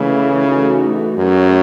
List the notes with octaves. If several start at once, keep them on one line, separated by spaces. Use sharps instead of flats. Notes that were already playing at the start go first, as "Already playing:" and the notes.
Already playing: C#3 E3 A3 E4
E3 A3 D#4 F#4 A4
F#2 A3 C#4 G#4 C#5